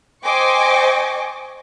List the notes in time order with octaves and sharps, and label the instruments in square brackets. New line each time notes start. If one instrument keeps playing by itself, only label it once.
[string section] C5 D#5 G5 G#5 C#6 D6